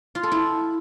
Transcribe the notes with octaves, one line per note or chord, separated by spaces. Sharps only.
F4
A4
E4